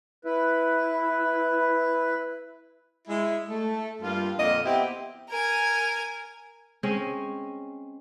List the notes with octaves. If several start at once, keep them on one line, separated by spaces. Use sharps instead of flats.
E4 B4
G#3 E4
A3
G2 A#3 F4
F2 A#2 D3 A#3 D#5
B3 C4 E4 G4
A#4 G#5
G#3 C4 C#4